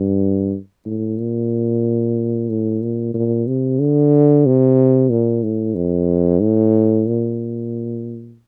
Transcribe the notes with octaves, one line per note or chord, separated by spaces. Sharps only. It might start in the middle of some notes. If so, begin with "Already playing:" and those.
Already playing: G2
A2
A#2
A2
A#2
A#2
C3
D3
C3
A#2
A2
F2
A2
A#2